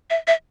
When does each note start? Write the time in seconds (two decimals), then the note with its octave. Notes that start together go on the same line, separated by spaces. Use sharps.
0.10 E5
0.27 E5